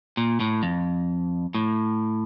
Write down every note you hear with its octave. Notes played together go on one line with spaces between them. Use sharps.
A#2
A2
F2
A2